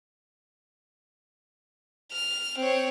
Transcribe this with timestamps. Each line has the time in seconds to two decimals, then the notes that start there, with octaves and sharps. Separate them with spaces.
2.12 F6
2.58 C4 C#5